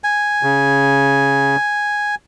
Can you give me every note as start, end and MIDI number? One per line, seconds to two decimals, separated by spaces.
0.04 2.15 80
0.43 1.56 49